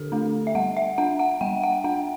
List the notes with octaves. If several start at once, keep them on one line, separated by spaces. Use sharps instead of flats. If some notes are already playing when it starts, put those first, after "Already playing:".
Already playing: D3 D4 G4 A4
A3 D4
E5
G3 F#5
E5
D4 F#5
F#5
G3 G5
F#5
D4 F#5